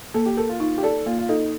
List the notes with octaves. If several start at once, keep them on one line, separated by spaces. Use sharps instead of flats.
A#3 A4
G4
A4 A#4
F4
D#4 F4
G4
A4 D5
A#3 F4
F4
D#4 A4